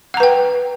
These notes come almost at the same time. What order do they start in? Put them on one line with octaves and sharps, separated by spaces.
F#5 A#5 B4 G5